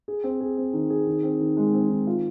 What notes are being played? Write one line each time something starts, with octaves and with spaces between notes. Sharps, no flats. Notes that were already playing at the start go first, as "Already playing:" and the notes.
G#4
C4
G#4
C4
D#3
G#4
D#3
C4
D#3
G#3
C4
D#3
F4